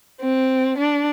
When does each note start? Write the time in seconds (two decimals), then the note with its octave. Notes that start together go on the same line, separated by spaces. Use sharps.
0.21 C4
0.78 D4